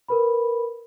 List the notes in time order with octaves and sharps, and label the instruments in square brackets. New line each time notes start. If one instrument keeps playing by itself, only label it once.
[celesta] A#4 B4 B5